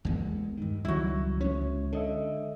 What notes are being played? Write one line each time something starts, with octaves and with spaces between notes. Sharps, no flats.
A1 E2 G#3 A#3 B3
G2 D#3
C#2 D#3 F#3 G3 E4 F#4
D2 G#3 A#3 C#4 C#5
D3 A4 D#5 E5